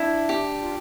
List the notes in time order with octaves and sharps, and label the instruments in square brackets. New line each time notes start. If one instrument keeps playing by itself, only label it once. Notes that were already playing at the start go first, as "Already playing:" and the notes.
Already playing: [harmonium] D4 [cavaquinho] E4
[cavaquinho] G4
[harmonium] F4